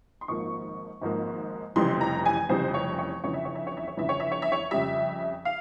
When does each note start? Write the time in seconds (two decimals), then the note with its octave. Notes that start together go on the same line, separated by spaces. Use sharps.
0.21 C6
0.28 G#1 G#2 F3 A#3 C#6
1.02 G#1 G#2 F3 A#3
1.76 F1 F2 C#3 E3 G3 C6
2.01 A#5
2.26 G#5
2.49 F1 F2 C#3 E3 G3 C5
2.74 C#5
2.99 C#5
3.24 G1 F2 C#3 E3 C#5
3.34 E5
3.45 C#5
3.55 E5
3.67 C#5
3.77 E5
3.88 C#5
3.97 G1 F2 C#3 E3 E5
4.09 C#5
4.20 E5
4.32 C#5
4.42 E5
4.52 C#5
4.71 F2 C#3 G3 E5
5.45 F5